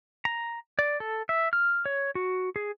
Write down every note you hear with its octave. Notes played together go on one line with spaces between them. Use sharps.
A#5
D5
A4
E5
F6
C#5
F#4
G#4